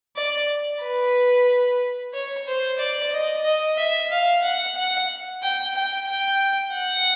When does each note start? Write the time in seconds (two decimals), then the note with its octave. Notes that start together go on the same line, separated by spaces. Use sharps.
0.16 D5
0.82 B4
2.14 C#5
2.47 C5
2.79 D5
3.13 D#5
3.45 D#5
3.77 E5
4.11 F5
4.43 F#5
4.76 F#5
5.43 G5
5.75 G5
6.08 G5
6.73 F#5